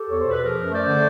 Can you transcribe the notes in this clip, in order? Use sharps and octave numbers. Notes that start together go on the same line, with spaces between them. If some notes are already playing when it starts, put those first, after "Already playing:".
Already playing: G4 A4
E2 C#5
B2 C5
B4
F3 G#4 A#4
F#2
A3 C5 D5
D3